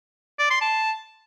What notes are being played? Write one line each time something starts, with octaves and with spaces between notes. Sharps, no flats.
D5
C6
A5